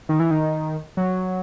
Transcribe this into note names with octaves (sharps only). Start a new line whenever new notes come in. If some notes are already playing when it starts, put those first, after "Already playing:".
D#3
E3
D#3
F#3